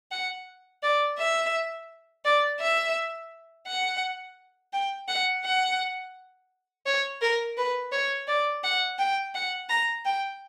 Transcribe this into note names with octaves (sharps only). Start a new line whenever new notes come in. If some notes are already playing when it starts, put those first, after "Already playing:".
F#5
D5
E5
D5
E5
F#5
G5
F#5
F#5
C#5
A#4
B4
C#5
D5
F#5
G5
F#5
A#5
G5